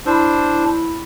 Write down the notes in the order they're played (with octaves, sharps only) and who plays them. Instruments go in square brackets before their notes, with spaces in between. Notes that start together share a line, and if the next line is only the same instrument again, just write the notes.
[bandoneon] D4 C5 [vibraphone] E4 B5